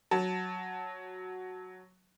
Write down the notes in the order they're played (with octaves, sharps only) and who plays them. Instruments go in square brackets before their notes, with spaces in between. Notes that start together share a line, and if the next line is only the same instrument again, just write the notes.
[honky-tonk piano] F#3 A5